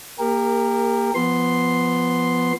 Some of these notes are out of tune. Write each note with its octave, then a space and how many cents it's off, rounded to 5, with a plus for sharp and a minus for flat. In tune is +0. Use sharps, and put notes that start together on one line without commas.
A#3 +0 G4 +30 A#4 -10
F3 -15 B3 +0 C6 +0